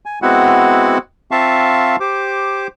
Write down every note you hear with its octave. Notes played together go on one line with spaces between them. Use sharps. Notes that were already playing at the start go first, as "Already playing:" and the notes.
G#5
G#3 B3 C4 E4 F#4 F#5
C4 F4 E5 F5 A5 C#6
G4 C5 D6